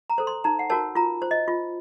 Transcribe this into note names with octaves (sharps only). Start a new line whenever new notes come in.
A#5
A4 C5
C6
D#4 A#5
F#5
F#4 A#4 C#5 A5
F4 A#5
C5
D#5
F4